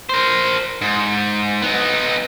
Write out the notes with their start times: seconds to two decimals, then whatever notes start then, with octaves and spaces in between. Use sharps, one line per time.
0.09 A#4 C5
0.81 G#2
1.62 B3 D#4